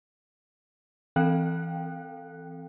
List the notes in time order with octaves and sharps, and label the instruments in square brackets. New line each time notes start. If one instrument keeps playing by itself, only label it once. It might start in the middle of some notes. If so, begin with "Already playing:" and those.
[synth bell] E3 C4 A4 F5 G5 F#6